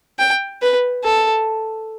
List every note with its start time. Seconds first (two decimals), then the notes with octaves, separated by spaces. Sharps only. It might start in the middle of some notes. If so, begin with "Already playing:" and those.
0.19 G5
0.62 B4
1.04 A4